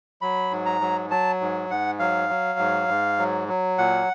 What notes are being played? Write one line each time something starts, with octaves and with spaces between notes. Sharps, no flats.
F#3 B5
G#2
A#5
F#3
F#3 A5
G#2
G#2 F#5
F#3 F5
F#3
G#2
G#2
F#3
F#3
A#2 F#5